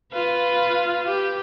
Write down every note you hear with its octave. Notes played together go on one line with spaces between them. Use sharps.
F4 B4
G4